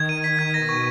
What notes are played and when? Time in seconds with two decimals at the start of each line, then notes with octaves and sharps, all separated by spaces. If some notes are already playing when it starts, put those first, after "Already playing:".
Already playing: D#3 G#6
0.09 D#7
0.24 B6
0.39 G#6
0.54 B2 A#6
0.69 C#6